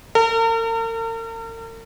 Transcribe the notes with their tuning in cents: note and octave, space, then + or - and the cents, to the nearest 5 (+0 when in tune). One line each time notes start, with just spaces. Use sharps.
A#4 -45